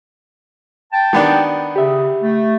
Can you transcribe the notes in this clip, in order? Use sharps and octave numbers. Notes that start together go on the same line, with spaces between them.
G5 A5
D#3 B3 D4
C#3 G4 E5
A3